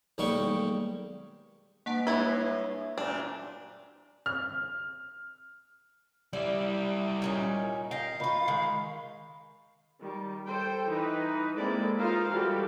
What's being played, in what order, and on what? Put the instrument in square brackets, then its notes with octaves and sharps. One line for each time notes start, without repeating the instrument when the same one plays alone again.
[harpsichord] B1 D#3 G3 G#3 A#3 C#6
[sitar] G2 [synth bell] A#3 F#5 A5
[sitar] G2 G#3 C#5 [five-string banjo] E4 B4 [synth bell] E5
[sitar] F#2 A#2 [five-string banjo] D4
[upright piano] F6
[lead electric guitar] G3 E4 [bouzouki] D5
[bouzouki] A#2 C#4 D#4
[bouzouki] D#5 G5 [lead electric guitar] F5
[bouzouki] D#3 F4 [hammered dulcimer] D#5 B5 C#6
[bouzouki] D#3 G#3
[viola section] D#3 G3
A4 C5 G5
E3 D#4 B4
G#3 A#3 C4 E4 A4 D5
D#4 F4 A#4 C5 F5
E3 G3 F#4 G4 A4